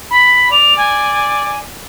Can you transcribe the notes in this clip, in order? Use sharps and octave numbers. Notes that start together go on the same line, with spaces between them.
B5
D5 F7
G#5